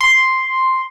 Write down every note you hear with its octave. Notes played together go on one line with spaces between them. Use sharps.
C6